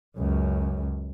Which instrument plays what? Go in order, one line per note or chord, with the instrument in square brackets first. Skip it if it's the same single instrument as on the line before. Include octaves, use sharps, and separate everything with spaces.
[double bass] C#2 F#2